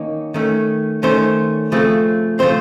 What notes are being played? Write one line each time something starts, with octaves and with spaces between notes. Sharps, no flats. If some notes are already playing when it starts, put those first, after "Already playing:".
Already playing: D#3 A#3 C#4 D#4
D#3 A3 C#4
D#3 A3 C#4 C5
C#3 F3 A3 C4
C#3 F3 A3 C4 C5